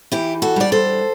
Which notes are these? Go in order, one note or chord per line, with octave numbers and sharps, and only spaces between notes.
E3 E4 G4
F#4 A4
G3 D4 D5
A4 C5